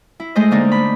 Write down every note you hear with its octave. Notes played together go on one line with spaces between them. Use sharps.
E4
G#3 A3 C5 D#5
D3 A#3 D4 D#4
B5